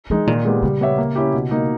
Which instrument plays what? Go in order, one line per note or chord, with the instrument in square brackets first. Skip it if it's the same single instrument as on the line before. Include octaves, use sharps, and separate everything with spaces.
[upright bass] E3 [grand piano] G#3 D#4
[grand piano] A#2 [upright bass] D#3
[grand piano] G#3 B3 G4
[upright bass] C#3 [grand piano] G3
[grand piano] B3 G4 C#5 E5
A#3
C#4 E4 G4
B2
A#3 D#4